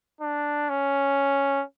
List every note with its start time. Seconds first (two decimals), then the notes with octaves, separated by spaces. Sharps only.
0.21 D4
0.70 C#4